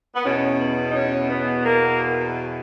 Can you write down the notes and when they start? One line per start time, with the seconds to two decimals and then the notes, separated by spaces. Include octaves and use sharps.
0.15 B3
0.24 E2 B2 C#4
0.59 B3
0.91 D#4
0.94 C#4
1.29 B3
1.65 A#3